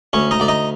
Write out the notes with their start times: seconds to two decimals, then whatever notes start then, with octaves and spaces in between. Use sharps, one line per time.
0.13 D2 C#4 C#5
0.31 D#4 D#5
0.40 D2 D5
0.48 D#4 D#5